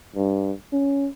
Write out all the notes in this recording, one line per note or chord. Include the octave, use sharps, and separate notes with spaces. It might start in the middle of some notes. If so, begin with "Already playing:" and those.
G2
C#4